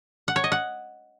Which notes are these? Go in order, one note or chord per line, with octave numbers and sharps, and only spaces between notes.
F#5
C#5
D#5
F#5